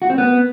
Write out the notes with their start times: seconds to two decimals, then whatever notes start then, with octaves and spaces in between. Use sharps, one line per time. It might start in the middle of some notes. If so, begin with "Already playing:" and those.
0.02 F#4
0.10 C4
0.18 B3